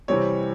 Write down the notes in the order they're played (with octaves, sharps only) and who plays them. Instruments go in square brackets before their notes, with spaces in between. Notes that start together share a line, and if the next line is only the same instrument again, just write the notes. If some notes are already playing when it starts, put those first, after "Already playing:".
[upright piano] C3 E3 G3 C4 C#5